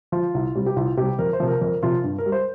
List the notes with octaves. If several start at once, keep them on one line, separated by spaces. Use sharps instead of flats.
F3 F4
C2
C3 G3
G4
C2 F4
C3 G3 G4
F2 A#4
C5
C3 F3
A#4
F2 A#4
C3 F3 F4
G2
A#4
G3
C5